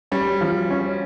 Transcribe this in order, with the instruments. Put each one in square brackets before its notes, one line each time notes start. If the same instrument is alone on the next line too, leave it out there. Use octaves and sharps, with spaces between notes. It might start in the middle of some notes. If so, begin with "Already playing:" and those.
[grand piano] G3 [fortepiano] C#4
[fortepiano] F3
C#4